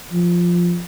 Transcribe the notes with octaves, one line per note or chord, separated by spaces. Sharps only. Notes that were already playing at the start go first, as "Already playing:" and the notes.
F3